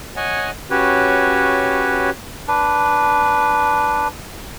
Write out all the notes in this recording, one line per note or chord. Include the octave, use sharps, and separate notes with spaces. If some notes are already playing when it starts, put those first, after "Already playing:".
C#5 D#5 F#5 G#5
C#4 F#4 G4 B4 C#5
D4 B4